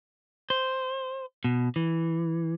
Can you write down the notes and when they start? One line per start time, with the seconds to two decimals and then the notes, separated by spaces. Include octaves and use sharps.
0.50 C5
1.44 B2
1.76 E3